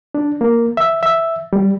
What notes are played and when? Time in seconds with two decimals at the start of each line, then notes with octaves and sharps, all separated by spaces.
0.15 D4
0.41 A#3
0.77 E5
1.03 E5
1.53 G3